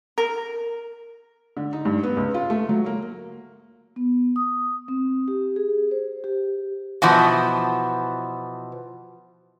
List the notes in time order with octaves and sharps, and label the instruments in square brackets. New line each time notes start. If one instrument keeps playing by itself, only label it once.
[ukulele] A#4
[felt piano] D3
D#4
G2
B3
C#2
F4
A3
F#3
A#3
[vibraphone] B3
D#6
C4
G4
G#4
C5
G4
[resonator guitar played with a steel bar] B2 E3 F3